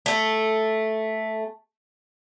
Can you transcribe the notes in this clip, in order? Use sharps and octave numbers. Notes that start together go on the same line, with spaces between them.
A3 A4